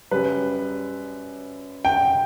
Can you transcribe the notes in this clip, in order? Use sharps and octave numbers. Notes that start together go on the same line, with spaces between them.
F#2 C#3 G3 B4
G5